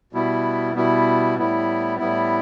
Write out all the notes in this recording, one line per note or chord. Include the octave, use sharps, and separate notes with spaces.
B2 G3 B3 E4
B2 G3 B3 E4
A2 G3 B3 E4
A2 G3 B3 E4